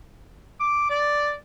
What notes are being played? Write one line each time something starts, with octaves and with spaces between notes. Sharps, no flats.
D6
D5